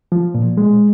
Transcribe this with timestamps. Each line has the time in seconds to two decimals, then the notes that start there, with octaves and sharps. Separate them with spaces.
0.12 F3
0.35 A#2
0.57 G#3